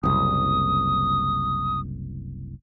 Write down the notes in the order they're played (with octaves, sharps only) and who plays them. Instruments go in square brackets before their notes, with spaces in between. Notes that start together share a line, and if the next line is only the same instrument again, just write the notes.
[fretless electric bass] F#1 C2 [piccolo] D#6